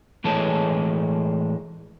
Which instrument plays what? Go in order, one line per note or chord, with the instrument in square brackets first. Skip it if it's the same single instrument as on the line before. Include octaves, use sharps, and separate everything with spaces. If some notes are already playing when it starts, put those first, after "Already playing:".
[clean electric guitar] A2 E3 G#3 A4 C#5 A5